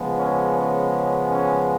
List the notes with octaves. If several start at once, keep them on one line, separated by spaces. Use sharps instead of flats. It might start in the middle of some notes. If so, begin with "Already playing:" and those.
Already playing: C#3 F3 G#3 B3
C#4
C#4
C#4